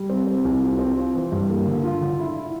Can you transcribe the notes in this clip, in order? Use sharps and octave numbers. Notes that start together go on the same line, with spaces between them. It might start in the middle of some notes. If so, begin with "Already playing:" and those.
Already playing: G3
C4
C4
C2
F4
C4
F4
E3
G2
A#3
D3
F4
D3
E4
E4